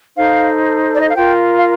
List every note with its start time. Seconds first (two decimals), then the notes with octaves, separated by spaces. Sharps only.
0.17 D#4 A4 C5 F5
0.93 D5
1.01 D#5
1.09 F5
1.15 F4 A#4 G5
1.57 F5